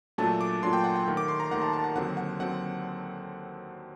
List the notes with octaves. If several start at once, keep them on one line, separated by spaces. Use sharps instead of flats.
A#2 F#3 A3 D4 A5
D6
A#2 F#3 A3 D4 C6
G5
F#5
G5
D#2 D#3 A3
D6
C6
A#5
D#2 D#3 A3 F#5
A5
A5
F#5
D#2 D3 F#3 C4 F#5
F#5
D3 F#3 C4 F#5